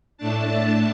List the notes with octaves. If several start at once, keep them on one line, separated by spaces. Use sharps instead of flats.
A2 A3 D4 A5